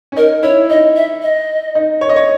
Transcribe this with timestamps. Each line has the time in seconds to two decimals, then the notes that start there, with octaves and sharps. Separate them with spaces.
0.12 C#4
0.16 D#4 A#4
0.43 E4 C#5
0.70 D#4 D#5
0.96 E5
1.22 D#5
1.75 D#4
2.01 C#5
2.09 D#5
2.16 C#5